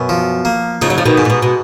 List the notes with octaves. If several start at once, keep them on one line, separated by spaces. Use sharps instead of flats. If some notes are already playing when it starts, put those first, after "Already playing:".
Already playing: F#2 B2
F3
A#3
C#3 F3 D#4
F#3
F3
B2 D#3
G#2
A#2
B2
B2